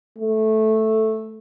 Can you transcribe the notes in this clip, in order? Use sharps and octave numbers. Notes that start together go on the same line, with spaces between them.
A3